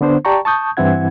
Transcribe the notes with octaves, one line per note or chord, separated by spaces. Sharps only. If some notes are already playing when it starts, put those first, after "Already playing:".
D3 B3 D4 C5
G4 D5 G5 A5 A#5 C#6
A5 C#6 D#6 G6
G2 E3 C4 E4 F#5 G#6